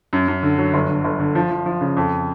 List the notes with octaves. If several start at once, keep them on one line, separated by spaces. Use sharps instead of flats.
F#2
F#2
D3
F#3
G1
D3
G1
D3
F3
F3
F3
C#3
F2